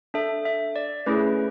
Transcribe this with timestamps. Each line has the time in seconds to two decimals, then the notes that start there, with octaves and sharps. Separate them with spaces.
0.14 D4 A4 E5
0.45 E5
0.76 D5
1.06 A3 C#4 E4 G#4 B4